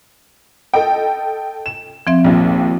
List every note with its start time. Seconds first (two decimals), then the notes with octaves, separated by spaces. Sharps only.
0.74 A4 D#5 G5
1.66 E7
2.07 F3 C4 E5
2.24 A#1 D#2